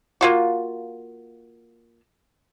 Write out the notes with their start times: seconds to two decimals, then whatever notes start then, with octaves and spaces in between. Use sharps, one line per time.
0.21 A#3 F4 F#4